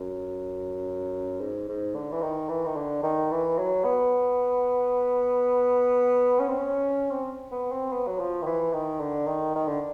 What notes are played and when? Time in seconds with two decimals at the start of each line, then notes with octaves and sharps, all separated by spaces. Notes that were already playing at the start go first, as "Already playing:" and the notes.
Already playing: F#2
1.41 G#2
1.68 G#2
1.95 D3
2.12 E3
2.22 D#3
2.49 E3
2.65 D#3
2.76 D3
3.03 D#3
3.31 E3
3.58 F#3
3.84 B3
6.39 C#4
6.49 C4
6.57 C#4
7.11 C4
7.52 B3
7.72 C4
7.92 B3
8.07 F#3
8.20 F3
8.42 D#3
8.46 E3
8.73 D#3
9.00 D3
9.27 D#3
9.55 D#3
9.67 D3